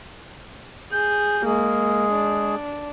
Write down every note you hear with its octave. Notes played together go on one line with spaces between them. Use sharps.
G#4 G6
G#3 A#3 G#4
D4